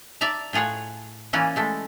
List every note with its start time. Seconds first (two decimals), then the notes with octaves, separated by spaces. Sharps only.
0.21 D5 E5 A5 A#5
0.53 A2 F4 G#4 C#5 F#5
1.33 E3 A#3 C#4 B4 D5
1.56 G#3 A3 E4